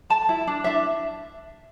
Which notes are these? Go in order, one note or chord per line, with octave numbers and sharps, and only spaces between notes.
A4 A5
E4
D4
D4 E5